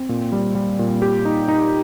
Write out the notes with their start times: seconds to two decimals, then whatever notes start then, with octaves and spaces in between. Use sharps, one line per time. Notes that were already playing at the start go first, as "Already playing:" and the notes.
Already playing: C4
0.09 A#2
0.32 G3
0.55 G3
0.79 A#2
1.02 G4
1.25 D#4
1.48 D#4